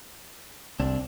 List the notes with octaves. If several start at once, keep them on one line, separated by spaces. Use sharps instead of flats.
C2 C4 D4